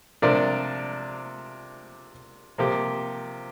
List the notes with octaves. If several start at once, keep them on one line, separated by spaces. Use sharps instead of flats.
C3 F3 D4 A#4 D5
C3 F3 A#3 G4